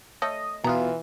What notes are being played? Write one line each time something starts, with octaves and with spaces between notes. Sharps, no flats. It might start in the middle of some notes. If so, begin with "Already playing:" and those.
A3 A4 C#5 D#5
B2 E3 B3 F4 A#5